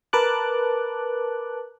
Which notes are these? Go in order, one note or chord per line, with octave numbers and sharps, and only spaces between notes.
A#4 B4 A5 D6 F#6